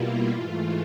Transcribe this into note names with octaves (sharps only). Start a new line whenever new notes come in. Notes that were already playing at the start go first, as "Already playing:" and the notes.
Already playing: B2 G3 A#3 E4 F4
G#2 E3 A3 F4